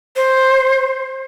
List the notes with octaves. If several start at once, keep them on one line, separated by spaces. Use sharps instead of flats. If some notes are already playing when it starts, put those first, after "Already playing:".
C5